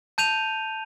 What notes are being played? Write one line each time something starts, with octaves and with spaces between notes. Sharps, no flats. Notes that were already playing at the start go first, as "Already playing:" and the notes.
A5 G6 D#7 F7